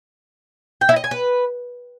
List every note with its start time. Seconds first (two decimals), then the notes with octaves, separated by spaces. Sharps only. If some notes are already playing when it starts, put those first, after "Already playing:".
0.81 G5
0.89 E4
0.96 D#5
1.04 G#5
1.11 B4